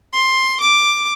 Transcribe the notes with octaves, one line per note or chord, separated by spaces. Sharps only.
C6
D6